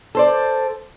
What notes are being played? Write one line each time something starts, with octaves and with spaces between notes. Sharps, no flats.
A4 C5 D5